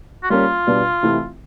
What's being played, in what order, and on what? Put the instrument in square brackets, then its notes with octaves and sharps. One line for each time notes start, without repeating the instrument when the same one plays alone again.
[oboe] F#4
[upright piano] G3 A#3 C#4 [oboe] F4
[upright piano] B2 G3 B3 D4
C3 E3 A3 C4 E4